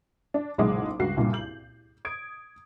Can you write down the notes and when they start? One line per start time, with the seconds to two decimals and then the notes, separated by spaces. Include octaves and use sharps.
0.34 D4
0.58 F#1 B1 A#2 G#3 F#5 D6
0.99 C#2 G2 F#4 C7
1.17 C2 G2 A#2
1.33 G6 F#7
2.05 D#6 G#6 D7